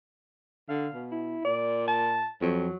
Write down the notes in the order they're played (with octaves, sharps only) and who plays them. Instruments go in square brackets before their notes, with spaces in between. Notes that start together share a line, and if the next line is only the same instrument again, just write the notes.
[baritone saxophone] D3 [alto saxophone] F5
[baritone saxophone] B2
[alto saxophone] E4
[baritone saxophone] A#2 [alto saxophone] D5
[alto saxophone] A5
[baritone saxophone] F2 [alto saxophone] F#3